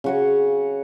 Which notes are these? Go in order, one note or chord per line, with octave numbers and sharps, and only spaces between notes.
C#3 F#4 C#5